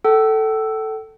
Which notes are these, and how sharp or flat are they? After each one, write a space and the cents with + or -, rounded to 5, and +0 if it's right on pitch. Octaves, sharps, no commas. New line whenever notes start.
A4 +0 G5 -45